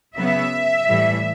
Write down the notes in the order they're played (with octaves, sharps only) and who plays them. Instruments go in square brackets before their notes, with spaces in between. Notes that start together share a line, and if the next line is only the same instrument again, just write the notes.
[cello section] C#3 F#3 B3 E5
A2 E3 G3